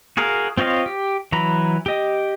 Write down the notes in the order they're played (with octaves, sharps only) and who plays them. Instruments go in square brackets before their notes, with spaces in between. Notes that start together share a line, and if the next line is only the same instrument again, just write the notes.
[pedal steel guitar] F#4 G#4 A#4 F5
C4 F4 C#5 D#5 F5
G4
E3 F#3 A#5 B5
G4 D#5